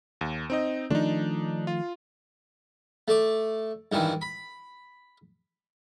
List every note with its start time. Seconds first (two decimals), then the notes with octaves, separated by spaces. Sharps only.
0.21 D#2
0.50 C4 D#4 D#5
0.90 D#3 F3 A3 D4 D#4
1.67 F4
3.08 A3 D5
3.92 G2 D#3 E3
4.21 B5